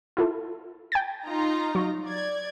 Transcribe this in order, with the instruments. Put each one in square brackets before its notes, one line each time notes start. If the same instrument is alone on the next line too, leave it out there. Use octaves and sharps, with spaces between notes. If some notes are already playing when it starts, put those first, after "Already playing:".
[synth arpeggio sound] E4 F4 A4
G5 G#6 A6
[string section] D#4 F4 A#5
[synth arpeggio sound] F#3 C#6
[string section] D5 G#6